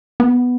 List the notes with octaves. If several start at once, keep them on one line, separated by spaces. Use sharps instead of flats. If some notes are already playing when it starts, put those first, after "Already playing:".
B3